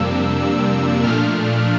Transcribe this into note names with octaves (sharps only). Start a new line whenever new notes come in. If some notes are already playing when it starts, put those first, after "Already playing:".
Already playing: F2 C3 G3 A#3 D4 E6
E6
A#2 F3 A3 D4 F6